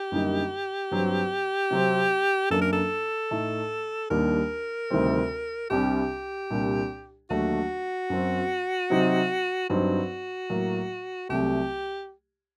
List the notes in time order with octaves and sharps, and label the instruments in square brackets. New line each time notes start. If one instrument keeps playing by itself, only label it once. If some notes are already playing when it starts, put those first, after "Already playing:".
Already playing: [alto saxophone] G4
[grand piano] F#2 D3 G3 A#3 D#4
G2 F#3 C4
C3 F#3 C4
[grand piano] F#2 F#3 A#3 D4 [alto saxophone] A4
[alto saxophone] A#4
A4
[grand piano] A2 A3 D#4
[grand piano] D#2 D#3 G3 A#3 D4 [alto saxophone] A#4
[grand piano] D2 C3 D#3 G3 C4
[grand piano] C2 C3 G3 D4 [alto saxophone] G4
[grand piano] C2 A#2 G3 D4
[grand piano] D#2 D3 F#3 A3 D4 [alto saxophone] F#4
[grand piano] F#2 F#3 C4
C3 F#3 C4 D#4
[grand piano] G2 F#3 C4 D#4 [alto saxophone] F#4
[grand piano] A2 F#3 A#3
[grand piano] C2 C3 F#3 A3 [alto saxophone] G4